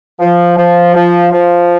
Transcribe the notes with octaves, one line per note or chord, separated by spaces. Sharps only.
F3
F3
F3
F3